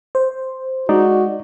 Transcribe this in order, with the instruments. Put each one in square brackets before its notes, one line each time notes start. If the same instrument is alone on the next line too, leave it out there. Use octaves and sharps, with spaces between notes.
[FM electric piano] C5
[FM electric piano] G#3 [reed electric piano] D#4 D5 [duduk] F#4